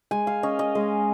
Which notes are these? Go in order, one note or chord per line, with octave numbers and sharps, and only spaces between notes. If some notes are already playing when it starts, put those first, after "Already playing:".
G#3 G#5
F5
C#4 D#5
D#5
G#3